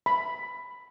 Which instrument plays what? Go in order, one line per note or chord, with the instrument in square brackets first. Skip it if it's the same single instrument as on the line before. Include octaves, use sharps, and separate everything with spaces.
[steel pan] B5